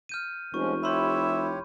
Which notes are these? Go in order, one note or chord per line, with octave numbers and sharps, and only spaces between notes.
F6 G6 D#7
F1 F3 G#3 C#4 C#6
E4 G4 C#5 E5 B5 C6 G6